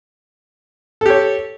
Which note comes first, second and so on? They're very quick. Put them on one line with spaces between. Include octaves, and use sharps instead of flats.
A4 G4 C#5